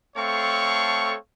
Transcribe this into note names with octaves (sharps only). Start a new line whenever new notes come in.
A3 C4 A4 C#5 F5 C#6